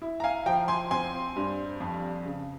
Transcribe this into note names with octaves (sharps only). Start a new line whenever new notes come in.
E4
A#5
F5 G#5
F3 G5 A#5
G#5 C6
C4 G#5 C6
G2
F2
C#3